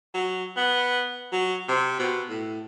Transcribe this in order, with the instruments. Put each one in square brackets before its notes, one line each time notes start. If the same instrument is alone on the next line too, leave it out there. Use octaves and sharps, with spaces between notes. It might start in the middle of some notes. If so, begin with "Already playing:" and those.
[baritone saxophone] F#3
B3
F#3
C3
B2
A2